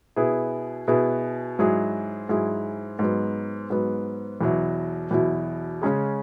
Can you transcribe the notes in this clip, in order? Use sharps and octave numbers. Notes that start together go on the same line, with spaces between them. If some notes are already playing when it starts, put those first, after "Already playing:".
B2 B3 E4 G#4
B2 B3 E4 G#4
G#2 F#3 E4 G#4
G#2 F#3 E4 G#4
G#2 F#3 B3
G#2 F#3 B3
E2 B2 F#3 E4
E2 B2 F#3 E4
C#3 G#3 C#4 G#4